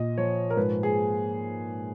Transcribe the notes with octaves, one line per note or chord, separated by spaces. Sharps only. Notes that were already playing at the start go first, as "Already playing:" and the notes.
Already playing: A#2 D#5
F3 C#5
A#4
G#2 B4
G#4